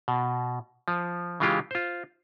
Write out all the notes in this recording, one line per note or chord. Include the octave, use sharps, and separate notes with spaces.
B2
F3
C#3 E3 G#3 F4 G4
F4 C5